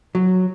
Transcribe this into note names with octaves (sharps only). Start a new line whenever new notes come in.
F#3